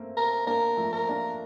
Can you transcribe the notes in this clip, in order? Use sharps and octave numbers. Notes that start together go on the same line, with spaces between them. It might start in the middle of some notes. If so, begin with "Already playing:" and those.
Already playing: A3 A#3 C4
A#4
A#3 D4 A#4
F3 A3
A#4
A#3 D4